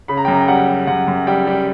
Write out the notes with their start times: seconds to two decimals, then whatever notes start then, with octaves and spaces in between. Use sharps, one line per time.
0.08 C#3 B5
0.17 A#5
0.25 G5
0.28 F#2
0.33 A#5
0.41 G5
0.48 G3 F#5
0.67 G3
0.87 F#2 F#5
1.08 F#2
1.27 G3 G5
1.47 G3